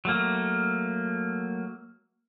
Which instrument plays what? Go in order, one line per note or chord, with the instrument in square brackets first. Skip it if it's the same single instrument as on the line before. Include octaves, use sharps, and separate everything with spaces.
[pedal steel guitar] F#3 A3 A#3